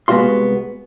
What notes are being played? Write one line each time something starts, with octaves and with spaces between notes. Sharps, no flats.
C2 G#3 B3 F#4 F5 C6